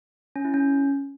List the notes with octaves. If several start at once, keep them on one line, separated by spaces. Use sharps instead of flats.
C#4
E4
C#4